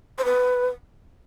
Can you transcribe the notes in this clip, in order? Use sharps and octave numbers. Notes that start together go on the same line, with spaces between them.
C5
B4